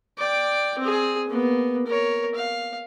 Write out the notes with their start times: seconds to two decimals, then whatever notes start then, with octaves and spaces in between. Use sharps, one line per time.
0.18 D5 G5
0.79 C4 G#4
1.28 A#3 B3
1.86 A#4 C#5
2.35 F5